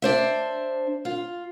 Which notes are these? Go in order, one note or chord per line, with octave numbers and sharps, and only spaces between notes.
D4 C5 E5
F4